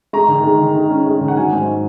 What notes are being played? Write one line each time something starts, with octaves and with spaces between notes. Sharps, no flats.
G#3 A#5
D#3
G#3
D#3
G#3
C#4
G#3
D#3
F#5
F#3 G#5
G#2